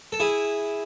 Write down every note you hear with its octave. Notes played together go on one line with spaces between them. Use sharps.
A4
E4 G#4